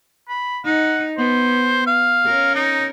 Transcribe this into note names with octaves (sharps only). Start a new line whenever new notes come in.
B5
D#4 F#5
B3 C5
F5
C#4 A#4
D#4